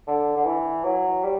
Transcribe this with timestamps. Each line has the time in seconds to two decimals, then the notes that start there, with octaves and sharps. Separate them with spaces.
0.08 D3
0.37 D3
0.46 E3
0.84 F#3
1.24 G3